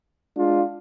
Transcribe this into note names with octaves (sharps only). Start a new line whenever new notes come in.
G#3 D4 F4